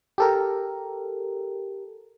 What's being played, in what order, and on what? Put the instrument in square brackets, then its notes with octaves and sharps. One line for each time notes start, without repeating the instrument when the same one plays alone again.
[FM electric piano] G4 A4 A#4